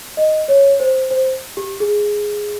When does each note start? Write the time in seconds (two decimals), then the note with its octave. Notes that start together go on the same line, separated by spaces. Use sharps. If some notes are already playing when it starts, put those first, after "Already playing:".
0.17 D#5
0.48 C#5
0.80 C5
1.10 C5
1.57 G4
1.80 G#4